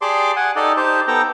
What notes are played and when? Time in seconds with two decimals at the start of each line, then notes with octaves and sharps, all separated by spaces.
0.02 G4 G#4 D5 A5 C6 D6
0.36 F#5 G#5
0.56 D#4 G4 A4 D5 D#5
0.77 D#4 G4 C5 A5
1.08 B3 A4 G5 A#5